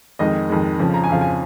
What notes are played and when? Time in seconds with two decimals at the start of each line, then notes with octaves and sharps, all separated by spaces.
0.19 F2 D#3 G#3 D#5
0.49 F2 D#3 G#3
0.79 F2 C#3 F3
0.94 A#5
1.04 G#5
1.09 F2 C#3 F3 F5
1.21 G#5